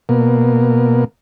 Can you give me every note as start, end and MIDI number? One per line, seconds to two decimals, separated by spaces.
0.09 1.04 47
0.09 1.04 58